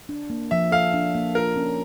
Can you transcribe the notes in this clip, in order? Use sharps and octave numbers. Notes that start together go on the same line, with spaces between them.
D4
A#3
F3 E5
A4 F5
D4
A#3
F4 A#4
C#4